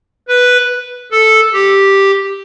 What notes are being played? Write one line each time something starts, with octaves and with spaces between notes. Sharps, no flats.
B4
A4
G4